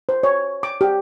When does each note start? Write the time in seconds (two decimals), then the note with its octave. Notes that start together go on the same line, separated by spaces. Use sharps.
0.09 C5
0.23 C#5
0.63 D6
0.81 G4